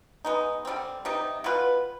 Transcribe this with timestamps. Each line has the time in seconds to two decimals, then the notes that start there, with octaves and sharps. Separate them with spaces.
0.25 G#3 B3 D#4
0.65 D3 G3 C4
1.05 C3 G3 B3 D#4
1.44 B2 B3 F4 B4